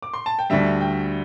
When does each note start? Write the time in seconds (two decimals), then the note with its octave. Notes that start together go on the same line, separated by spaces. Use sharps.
0.02 D6
0.14 C6
0.26 A5
0.39 G5
0.50 D2 D3 G3 E5
0.81 G5